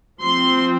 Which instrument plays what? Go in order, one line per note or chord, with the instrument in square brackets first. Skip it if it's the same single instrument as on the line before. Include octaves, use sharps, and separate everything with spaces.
[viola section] F3 C4 C6